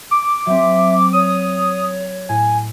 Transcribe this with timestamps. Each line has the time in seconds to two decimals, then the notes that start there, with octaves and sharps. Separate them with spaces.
0.11 D6
0.46 F#3 C4 E5
1.13 C#5 D#6
2.29 A2 G#5